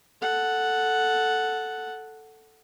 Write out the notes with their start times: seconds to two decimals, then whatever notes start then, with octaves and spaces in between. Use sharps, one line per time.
0.22 A4 F#5